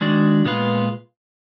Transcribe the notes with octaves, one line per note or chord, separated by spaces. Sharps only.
D#3 G#3 D4 F#4 D5
A#2 G#3 B3 F4 B4